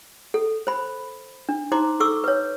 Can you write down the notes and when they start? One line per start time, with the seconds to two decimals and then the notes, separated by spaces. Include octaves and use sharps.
0.34 A4
0.67 C5 B5
1.49 D4
1.72 D#4 C5 A#5 C6 D6
2.00 A4 C#6 D6 E6
2.24 B4 C#5